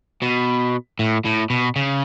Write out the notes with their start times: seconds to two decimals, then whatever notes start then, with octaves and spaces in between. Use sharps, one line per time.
0.22 B2
0.99 A2
1.25 A2
1.50 B2
1.76 C#3